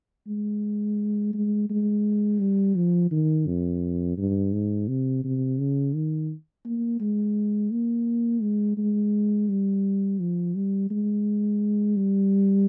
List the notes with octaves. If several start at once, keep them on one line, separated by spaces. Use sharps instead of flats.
G#3
G#3
G#3
G3
F3
D#3
F2
G2
G#2
C3
C3
C#3
D#3
A#3
G#3
A#3
G#3
G#3
G3
F3
G3
G#3
G3